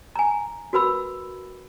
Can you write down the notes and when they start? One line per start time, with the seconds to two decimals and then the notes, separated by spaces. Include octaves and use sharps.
0.16 G#5 A#5
0.73 F#4 A#4 B4 B5 E6